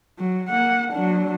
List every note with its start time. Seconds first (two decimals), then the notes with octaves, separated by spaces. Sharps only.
0.19 F#3
0.49 A#3 F#5
0.93 F#3 D4